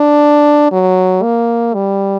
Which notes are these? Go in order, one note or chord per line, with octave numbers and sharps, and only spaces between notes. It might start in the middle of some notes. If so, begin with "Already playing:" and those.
Already playing: D4
F#3
A#3
G3